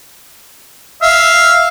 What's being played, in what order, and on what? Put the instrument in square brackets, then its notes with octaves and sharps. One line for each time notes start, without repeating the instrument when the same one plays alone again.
[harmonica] E5 F5